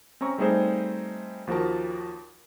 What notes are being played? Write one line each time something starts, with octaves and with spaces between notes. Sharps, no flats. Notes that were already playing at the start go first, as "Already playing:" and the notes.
C4 C#4 A#5 C#6
G3 A3 C4 D#4 G#4 C5
D#2 F3 F#4 A#4 A5